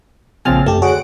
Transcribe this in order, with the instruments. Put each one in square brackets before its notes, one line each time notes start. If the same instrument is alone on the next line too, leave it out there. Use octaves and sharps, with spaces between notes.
[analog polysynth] A#1 F3 [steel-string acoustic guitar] C#3 C4 [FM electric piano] G#5 F6 A6
[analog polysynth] F#2 [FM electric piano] A3 G4 [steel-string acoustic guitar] A5
[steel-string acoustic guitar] D2 [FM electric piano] F#4 G#4 C#5 [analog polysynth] F#5 D7